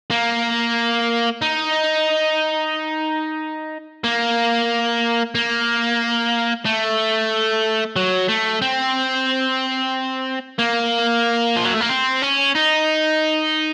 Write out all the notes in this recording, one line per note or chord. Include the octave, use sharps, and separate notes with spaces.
A#3
D#4
A#3
A#3
A3
F#3
A3
C4
A#3
F3
F#3
A3
A#3
C4
C#4
D#4